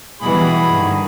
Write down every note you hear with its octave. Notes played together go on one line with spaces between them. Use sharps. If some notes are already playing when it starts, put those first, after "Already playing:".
B2 E3 G3 F#4 G#4 B5
G2 D3 D#3